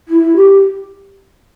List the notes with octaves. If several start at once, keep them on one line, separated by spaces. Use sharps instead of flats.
E4
G4